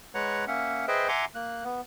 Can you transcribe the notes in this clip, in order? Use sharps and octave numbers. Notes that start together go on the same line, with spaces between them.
G#3 B4 C#5 F#5 A#5 F#6
A#3 C#4 E5 F#5
G#4 B4 C5 D#5 E5 G5
E5 F#5 G#5 A#5 C6 D6
A#3 F#6
B3